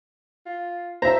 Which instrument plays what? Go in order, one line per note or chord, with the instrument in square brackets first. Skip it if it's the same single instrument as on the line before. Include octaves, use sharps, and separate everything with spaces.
[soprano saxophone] F4
[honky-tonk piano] C5 E5 [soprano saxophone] A#5